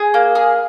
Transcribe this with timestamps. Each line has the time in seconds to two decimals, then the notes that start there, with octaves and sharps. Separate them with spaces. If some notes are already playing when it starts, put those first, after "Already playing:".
Already playing: G#4
0.14 A#3
0.35 G#4